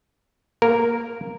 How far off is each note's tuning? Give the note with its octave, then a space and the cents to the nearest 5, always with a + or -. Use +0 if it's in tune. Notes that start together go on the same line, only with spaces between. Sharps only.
A#3 +0 A#4 -5